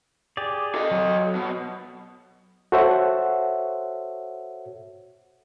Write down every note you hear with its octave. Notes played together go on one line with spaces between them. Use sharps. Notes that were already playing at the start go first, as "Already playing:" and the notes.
G4 G#4 D5
A4 D#5
F#3
B2
F#4 A4 C5 C#5 E5 F#5